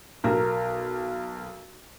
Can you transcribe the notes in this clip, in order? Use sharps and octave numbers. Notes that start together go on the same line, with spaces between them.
B1 A#4